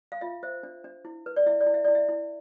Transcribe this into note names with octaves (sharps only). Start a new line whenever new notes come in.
F5
F4 E5
C5 E5
D4
D4
E4
B4
D5
E4 E5
D5
E4
E5
E4 D5
E5
E4